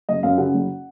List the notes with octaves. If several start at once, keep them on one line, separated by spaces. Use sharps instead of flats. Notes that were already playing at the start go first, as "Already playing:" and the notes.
F#1 D#5
F#2 F5
C#3 F#5
F#1